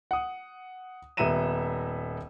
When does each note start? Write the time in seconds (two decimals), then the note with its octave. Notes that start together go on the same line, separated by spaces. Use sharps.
0.11 F#5 D#6
1.17 D#1 B3 E5 A#5 D#7 E7